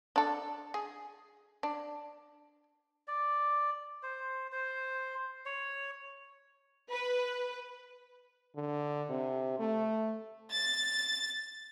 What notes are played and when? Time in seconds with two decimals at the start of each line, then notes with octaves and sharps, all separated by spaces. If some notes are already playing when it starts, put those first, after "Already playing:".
0.16 D4 A4
0.74 G#4
1.63 D4
3.08 D5
4.03 C5
4.52 C5
5.46 C#5
6.90 B4
8.56 D3
9.10 C3
9.59 A3
10.53 A6